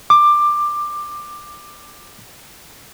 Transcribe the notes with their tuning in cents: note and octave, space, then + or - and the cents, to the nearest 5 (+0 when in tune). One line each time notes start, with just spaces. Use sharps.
D6 +15